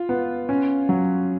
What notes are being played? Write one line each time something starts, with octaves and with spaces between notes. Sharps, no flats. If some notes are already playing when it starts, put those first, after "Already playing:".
Already playing: F4
B3
C#4
F#3